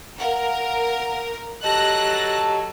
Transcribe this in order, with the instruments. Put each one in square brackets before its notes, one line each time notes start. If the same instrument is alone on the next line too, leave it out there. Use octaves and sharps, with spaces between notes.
[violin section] A#4 [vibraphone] F5 F#5
[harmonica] F#3 A4 A5 [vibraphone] G4 D#5 [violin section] F#6 A#6